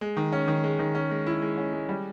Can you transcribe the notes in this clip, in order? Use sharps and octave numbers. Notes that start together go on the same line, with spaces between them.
G#3
D#3
C#4
D#3
G#3
D#3
C#4
G#3
E4
G#3
C#4
G#3
G3